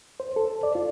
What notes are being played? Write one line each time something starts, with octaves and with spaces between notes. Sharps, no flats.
C5
A4
D5
F4